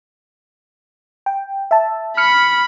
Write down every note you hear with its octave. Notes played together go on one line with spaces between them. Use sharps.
G5
E5 A5
B5 F6 C#7